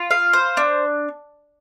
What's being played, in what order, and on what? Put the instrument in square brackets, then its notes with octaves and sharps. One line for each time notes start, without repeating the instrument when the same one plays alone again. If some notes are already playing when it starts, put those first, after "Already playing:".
Already playing: [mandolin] F4
F5
C5
D4